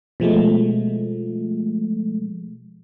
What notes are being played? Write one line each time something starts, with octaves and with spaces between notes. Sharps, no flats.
B2 F3 G#3 A3